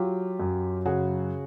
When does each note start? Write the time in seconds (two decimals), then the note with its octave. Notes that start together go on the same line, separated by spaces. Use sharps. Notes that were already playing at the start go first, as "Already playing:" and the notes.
Already playing: F#3 F4 G4
0.40 F#2
0.86 C#3 F#4 G#4